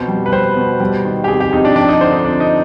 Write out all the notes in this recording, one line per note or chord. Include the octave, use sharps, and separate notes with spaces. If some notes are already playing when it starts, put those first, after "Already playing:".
Already playing: F2 B2 C5
G3
B4
G3 C5
B2
G3
D#3
G4
F2 G#4
G4
F2 D#4
D4
F3 D4
D#4
D3 C5
D#4
F2 D4
D#4